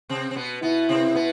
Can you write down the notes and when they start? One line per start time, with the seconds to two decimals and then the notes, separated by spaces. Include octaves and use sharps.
0.09 C3 C4
0.31 C4
0.36 B2 B3
0.62 B2 B3 E4
0.89 C3 C4
1.15 B2 B3